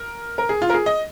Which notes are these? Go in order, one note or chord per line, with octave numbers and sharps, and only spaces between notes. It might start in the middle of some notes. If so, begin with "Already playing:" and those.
Already playing: A#4
A#4
G#4
F4
A#4
G#4
D#5